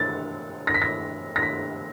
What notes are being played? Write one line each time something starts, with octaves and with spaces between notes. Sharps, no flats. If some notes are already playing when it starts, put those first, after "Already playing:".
Already playing: A6
A#6
B6
A#6
A#6
B6